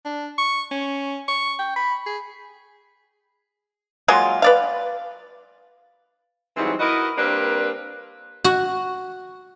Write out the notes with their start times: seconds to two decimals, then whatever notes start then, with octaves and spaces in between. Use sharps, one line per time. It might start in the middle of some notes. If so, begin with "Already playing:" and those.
0.05 D4
0.38 C#6
0.71 C#4
1.28 C#6
1.59 G5
1.76 B5
2.06 G#4
4.08 F#3 G#3 A#3 F4
4.42 B4 D5 F5
6.57 G#2 E3 F#3 G3 C4 D#4
6.79 E4 F#4 A#4 B4 D#5
7.18 G3 A#3 C4 D4 A#4 B4
8.44 F#4